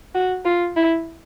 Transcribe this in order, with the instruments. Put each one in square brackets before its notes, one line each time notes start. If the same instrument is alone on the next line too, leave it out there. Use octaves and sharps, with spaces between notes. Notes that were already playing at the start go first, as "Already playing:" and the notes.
[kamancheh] F#4
F4
E4